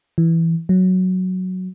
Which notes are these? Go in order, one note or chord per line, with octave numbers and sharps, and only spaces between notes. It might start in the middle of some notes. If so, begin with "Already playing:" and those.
E3
F#3